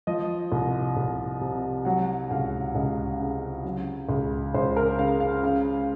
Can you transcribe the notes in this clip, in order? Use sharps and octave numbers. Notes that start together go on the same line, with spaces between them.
F3 D#5
C2
C2
C3
F#3 F#5
C#2 F5
C#2 D#5
C#3
F#3
C#2
C#2 C5
A#4
C#3 F5
F5
C#3 F5